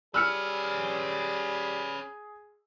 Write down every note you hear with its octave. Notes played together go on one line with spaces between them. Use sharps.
G3 C#4 G#4 B4 E6 F6 C#7